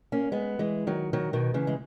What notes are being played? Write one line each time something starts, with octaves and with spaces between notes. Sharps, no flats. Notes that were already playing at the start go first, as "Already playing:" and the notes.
A#3 C#4
G#3 B3
E3 G#3
D#3 F#3
D#3 F#3
B2 D#3
C#3 E3
G#3